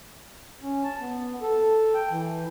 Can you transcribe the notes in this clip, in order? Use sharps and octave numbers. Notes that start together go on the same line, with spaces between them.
C#4
A5
B3
A4
G5
E3